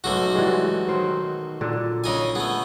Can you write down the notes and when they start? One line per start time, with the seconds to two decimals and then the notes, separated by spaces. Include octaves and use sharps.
0.04 B1 G#2 C#3 A3 F#4
0.35 E3 G3 G#3
0.88 D#3 F#3 C5
1.61 A#2 D3
2.04 C#3 D#4 G#5
2.35 A3 B3 G#4